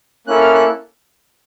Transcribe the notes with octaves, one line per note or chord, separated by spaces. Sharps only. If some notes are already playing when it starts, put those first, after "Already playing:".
A#3 C#4 E4 A4 F#6
F6
F#6